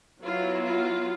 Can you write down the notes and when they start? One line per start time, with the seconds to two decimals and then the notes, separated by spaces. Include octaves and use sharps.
0.23 F#3 B3 E4 F4
0.64 F4